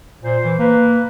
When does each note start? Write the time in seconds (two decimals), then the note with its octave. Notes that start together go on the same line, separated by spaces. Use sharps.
0.23 A#2 C5
0.44 E3
0.59 A#3 B4